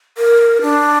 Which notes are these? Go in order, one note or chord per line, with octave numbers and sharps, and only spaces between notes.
A#4
D4